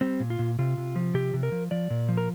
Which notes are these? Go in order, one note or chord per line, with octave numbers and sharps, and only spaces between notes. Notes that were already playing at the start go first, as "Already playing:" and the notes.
G3 C4
A#2
F4
A#2
C3 F4
C3
F3
C3 G4
C3
A#4
F3
F3 D5
A#2
F3
A#4